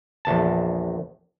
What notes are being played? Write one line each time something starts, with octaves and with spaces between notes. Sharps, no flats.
A#1 E2 A5